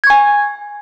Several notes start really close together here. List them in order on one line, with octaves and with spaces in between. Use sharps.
G#6 C#6 G#5